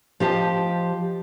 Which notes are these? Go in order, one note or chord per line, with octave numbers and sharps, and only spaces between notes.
F3 G4 D#5 A5